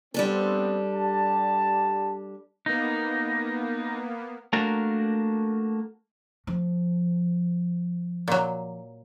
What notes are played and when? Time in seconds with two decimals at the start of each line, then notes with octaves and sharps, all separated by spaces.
0.14 G3 B3 C4 D4 A4
0.94 G4 D5 A5
2.66 A#3 B3 D#4
4.53 A3 A#3 D4 F#4 A#4
6.47 F3
8.28 A#2 F#3